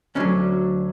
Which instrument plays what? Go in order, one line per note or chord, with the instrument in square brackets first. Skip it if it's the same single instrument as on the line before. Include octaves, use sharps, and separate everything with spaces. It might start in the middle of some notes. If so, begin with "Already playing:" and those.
[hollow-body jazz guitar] D2 D3 F#3 C#4